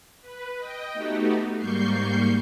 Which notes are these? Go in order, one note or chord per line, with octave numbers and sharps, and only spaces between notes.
B4
D#5 G5
A3 B3 D#4 F#4 G4
G#2 G3 A#3 C#6 G6 C7